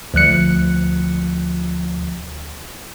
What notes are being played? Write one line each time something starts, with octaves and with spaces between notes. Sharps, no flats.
D2 F3 F#6 C#7